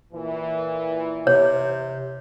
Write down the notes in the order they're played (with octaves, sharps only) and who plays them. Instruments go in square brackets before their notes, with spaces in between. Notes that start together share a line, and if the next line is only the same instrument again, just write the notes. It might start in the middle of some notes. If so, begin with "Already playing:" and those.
[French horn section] A#2 E3
[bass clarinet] C3 [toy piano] C#5